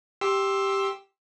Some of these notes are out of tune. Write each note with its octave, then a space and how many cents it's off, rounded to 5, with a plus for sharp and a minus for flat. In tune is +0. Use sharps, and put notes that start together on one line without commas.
G4 +0 C6 +15 E6 +0